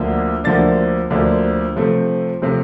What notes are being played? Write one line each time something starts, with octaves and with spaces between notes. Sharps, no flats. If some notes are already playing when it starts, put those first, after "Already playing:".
Already playing: D2 D3 F3 A#3 D4
D2 D3 F3 A#3 D4 A6
D2 D3 F3 A#3 D4
C3 F3 A3 C4
C3 F3 A3 C4